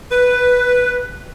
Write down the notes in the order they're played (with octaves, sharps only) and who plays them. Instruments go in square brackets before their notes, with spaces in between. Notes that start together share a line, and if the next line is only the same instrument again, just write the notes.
[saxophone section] B4